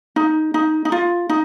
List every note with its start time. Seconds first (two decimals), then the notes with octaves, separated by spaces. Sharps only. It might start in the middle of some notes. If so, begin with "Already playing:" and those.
0.16 D#4
0.54 D#4
0.85 D#4
0.92 F4
1.29 D#4